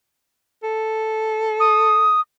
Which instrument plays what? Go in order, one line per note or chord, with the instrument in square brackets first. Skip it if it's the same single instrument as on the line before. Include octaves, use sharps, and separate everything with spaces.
[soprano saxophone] A4
[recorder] D#6